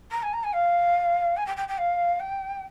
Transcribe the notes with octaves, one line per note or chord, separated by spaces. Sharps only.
A#5
G#5
A#5
G#5
F5
G#5
G5
G5
G5
F5
G5